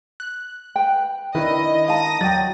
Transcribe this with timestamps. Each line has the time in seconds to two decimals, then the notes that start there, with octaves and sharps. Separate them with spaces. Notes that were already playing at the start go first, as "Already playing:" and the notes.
0.20 F#6
0.76 B4 G5
1.35 D#3 D4 E4 B4 D#5
1.88 F5 A5 A#5 D#6 A#6
2.21 F#3 D5 G5 A6